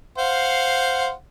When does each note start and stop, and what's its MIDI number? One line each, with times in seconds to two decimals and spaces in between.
0.18 1.12 72
0.18 1.12 77
0.18 1.12 78